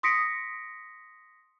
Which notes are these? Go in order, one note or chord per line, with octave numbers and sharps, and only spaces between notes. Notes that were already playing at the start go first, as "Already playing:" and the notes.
C6 D#6 A#6 B6 C#7 D7